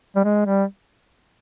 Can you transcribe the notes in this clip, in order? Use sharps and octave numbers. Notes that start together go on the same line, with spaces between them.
G3
G#3
G3